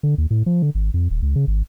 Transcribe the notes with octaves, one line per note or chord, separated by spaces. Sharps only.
D3
D#2
A2
F3
D3
G#1
F2
D#1
C#2
C#3
G#1